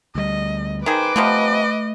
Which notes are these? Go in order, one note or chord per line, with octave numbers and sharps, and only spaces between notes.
D2 G3 D#5
D#3 G#4 B4 C5 D6
C3 F3 A3 B3 D#5